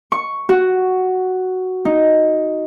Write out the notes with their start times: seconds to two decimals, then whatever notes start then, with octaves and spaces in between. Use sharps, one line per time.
0.12 C#6
0.49 F#4
1.85 D#4